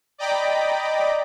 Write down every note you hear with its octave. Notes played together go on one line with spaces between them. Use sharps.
D5 D#5 G5 A#5 B5 D6